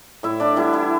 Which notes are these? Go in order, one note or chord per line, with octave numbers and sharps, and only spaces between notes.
A2 E4 E5
D4 D5
E3 G3 B3 E4 E5
E4 E5